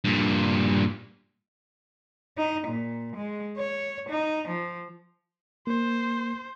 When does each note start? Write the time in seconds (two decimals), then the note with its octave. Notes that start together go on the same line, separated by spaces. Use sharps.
0.05 G2 A#2
2.38 D#4
2.68 A#2
3.16 G#3
3.57 C#5
4.10 D#4
4.49 F3
5.67 A#3 C5